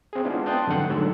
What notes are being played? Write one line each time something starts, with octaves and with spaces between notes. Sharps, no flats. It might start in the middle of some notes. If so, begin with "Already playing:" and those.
C4 G#4
G#3 B3 C#4 D4 E4 F4
G5 A5 C6 D#6 F#6 G6
F2 G#2 D3 F#3 F#5
G#2 D3 F#3 A3 E6